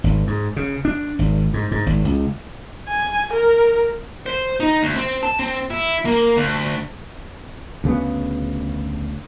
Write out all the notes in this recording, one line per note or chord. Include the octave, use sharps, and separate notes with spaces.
G#1
G#2
C#3
D4
G#1
G#2
G#2
G#1
C#2
G#5
A#4
C5
D#4
D2
C4
A5
C4
E4
A#3
D2
D2 C#3 A#3 B3